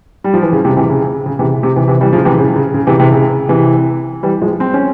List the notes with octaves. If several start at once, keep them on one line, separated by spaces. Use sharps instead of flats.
G3
F3
E3
C#3
C3
C3 E3
C#3
C#3
C3 E3
C3
C3 E3
C3 E3
E3 G3
C#3 F3
C3 E3
C#3
C#3
C#3
C3 E3
C3 E3
C#3
C3 E3
E3 G3
F3 G#3
C4
C#4